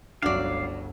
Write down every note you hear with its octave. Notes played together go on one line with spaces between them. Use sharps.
G1 C#2 F#3 C#4 D4 F#4 D5 F5